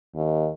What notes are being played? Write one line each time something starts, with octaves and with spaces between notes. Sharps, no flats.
D#2